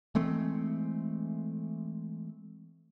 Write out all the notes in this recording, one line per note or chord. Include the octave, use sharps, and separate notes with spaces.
E3 G#3 A3 C4